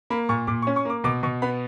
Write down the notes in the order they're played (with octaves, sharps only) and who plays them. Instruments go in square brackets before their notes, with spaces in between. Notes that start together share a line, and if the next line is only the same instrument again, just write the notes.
[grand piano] A#3 B5
A#2 C#6
A#2 D6
C#6
C#4
C#6
A#3 D6
B2 D6
B2 C#6
B3 B5